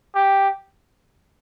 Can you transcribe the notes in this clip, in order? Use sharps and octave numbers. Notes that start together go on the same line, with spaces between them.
G4